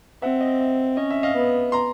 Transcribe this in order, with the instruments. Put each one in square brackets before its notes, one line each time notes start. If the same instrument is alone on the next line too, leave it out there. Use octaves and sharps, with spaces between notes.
[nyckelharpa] C4 [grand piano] E5 F#5
[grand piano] D#5
E5
[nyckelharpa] C#4 [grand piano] D#5
[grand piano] E5
D#5 F5
[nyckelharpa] B3
[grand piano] A#5 C6